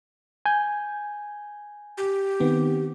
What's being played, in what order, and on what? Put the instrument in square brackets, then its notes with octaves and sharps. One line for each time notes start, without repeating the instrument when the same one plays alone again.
[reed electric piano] G#5 G6
[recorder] G4
[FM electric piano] D#3 B3 C4